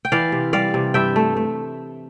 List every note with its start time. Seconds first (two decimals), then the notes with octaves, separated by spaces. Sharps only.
0.05 G5
0.12 E3 D5 F5
0.32 C3
0.53 G3 D5 F5
0.74 C3
0.94 G2 E5 G5
1.16 A3
1.37 A3